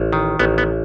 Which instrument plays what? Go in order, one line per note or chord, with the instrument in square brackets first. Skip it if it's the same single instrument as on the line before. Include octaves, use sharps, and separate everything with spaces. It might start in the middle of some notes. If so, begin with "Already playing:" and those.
Already playing: [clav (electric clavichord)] A1
D#3
A1 B3
B3